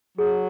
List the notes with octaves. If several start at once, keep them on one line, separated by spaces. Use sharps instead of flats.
F#3 G#4